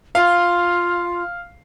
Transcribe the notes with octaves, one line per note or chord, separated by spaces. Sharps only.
F4 F5